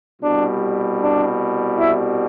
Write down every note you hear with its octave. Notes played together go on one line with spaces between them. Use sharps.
C2 B2 G3 D4
D4
E4